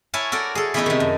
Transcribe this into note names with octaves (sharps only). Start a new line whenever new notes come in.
E4 A#4 C#5 G#5 A5
F#4 A4 A#4 D5
G#4 A4
E3 A3 B3 C#4 D#4 E4
C3 D#3
F#2